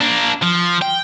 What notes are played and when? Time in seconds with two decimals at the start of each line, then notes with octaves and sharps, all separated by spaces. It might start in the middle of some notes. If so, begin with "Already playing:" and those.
0.01 A#3 D4
0.42 F3
0.82 G5